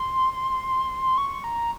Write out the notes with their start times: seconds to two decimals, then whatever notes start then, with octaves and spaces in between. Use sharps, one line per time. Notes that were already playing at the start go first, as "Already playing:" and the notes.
Already playing: C6
1.18 C#6
1.44 A#5